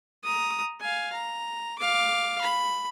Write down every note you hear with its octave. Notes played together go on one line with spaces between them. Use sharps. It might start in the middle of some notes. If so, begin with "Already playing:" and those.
A#5 D#6
F5 G#5
A#5
F5 D6
B5